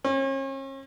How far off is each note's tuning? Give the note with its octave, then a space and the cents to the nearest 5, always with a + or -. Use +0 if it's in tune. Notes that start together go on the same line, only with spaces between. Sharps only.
C#4 -40